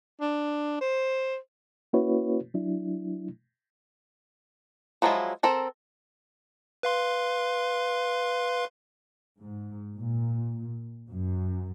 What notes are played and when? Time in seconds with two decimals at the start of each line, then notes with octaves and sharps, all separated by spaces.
0.21 D4
0.81 C5
1.93 A#3 C#4 E4 F#4 B4 C#5
2.54 F#3 D4 E4
5.02 F3 F#3 G#3 E4 F4
5.43 C4 A4 A#4
6.83 B4 F5 C6
9.40 G#2
9.97 A#2
11.06 F#2